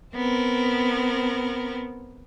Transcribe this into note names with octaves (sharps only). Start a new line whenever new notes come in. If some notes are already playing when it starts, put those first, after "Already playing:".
B3 C4 A#4